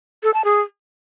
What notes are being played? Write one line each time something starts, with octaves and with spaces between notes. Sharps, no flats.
A4
A5
G#4